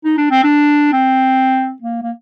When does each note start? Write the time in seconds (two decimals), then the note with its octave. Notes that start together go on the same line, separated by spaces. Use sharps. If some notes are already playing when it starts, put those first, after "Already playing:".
0.05 D#4
0.18 D4
0.31 C4
0.44 D4
0.93 C4
1.82 A#3
2.02 A#3